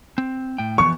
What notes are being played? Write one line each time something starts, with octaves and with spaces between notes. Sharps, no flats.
C4
A2 G5
E3 F3 B3 C#6